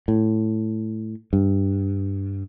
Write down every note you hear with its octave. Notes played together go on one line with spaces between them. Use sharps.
A2
G2